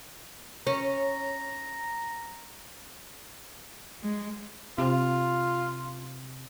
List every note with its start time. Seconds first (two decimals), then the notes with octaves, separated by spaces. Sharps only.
0.67 C#4 A#5
4.02 G#3
4.78 C3 F4